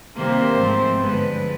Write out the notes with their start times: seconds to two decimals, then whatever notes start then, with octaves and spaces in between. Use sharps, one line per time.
0.15 C3 D#3 G3 A#3 C5
0.59 G#2 F3 A3 C4
1.01 G2 D3 F3 G#3 B3 B4